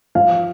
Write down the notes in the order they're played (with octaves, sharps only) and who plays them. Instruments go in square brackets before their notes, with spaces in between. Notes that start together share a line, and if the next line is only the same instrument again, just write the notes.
[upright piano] F3 F5